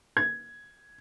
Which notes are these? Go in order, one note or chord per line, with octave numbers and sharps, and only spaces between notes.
G#6